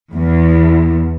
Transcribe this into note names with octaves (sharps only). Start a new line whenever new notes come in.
E2